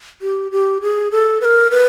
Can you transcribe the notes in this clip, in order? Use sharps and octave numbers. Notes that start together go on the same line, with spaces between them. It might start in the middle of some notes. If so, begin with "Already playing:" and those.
G4
G4
G#4
A4
B4
A#4
B4